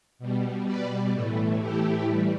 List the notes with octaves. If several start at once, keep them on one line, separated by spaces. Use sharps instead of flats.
B2 G3
B4 D5
A2 E3 A3
E4 G4
E3 G3